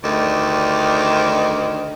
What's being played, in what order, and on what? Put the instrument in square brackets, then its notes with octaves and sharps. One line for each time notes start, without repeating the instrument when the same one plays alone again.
[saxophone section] D2 G2 D#3